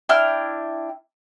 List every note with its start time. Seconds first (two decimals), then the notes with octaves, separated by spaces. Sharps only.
0.09 D4 E4 G5 F6